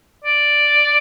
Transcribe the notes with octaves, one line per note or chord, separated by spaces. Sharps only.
D5